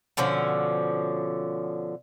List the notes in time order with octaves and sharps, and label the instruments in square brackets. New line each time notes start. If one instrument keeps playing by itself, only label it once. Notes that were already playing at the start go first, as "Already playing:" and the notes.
[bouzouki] B2 D3 F3 C#4